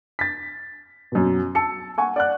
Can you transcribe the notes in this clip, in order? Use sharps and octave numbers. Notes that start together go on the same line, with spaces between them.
A6 B6
F#2 B2
A5 E6 C#7
F#5 G#5 C#6
D5 F#5 F#6